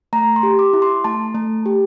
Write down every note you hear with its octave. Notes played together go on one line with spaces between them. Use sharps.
A3 A#5
C6
G4
D6
E4
C6
A3 A5
A3
G4